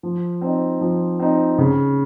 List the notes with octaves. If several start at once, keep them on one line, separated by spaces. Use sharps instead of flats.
F3
C4 D#4
F3
C4 D#4
C#3